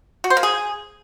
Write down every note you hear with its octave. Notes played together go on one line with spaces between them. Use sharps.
F#4
C5
A#3
G#4